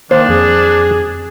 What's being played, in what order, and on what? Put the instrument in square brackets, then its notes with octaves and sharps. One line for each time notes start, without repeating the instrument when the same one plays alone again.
[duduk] D#3 [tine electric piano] A#3 [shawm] D4 [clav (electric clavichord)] C5
[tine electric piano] F2 [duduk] G#4